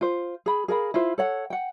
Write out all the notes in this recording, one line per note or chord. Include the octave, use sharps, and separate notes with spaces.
F4 C5
G#4 B5
G#4 A#4 F5 B5
E4 F4 C5
A4 C#5 F#5
F#5 G5